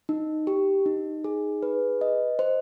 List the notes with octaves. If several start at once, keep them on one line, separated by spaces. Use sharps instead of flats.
D#4
G4
D#4
G#4
B4
D#5
C5